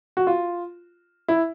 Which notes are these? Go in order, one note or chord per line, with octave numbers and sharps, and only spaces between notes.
F#4
F4
E4